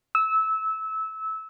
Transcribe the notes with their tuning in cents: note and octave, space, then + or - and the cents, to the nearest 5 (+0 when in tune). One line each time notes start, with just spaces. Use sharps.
E6 -20